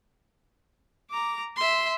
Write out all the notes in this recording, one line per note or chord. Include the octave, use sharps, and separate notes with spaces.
A#5 D6
E5 C6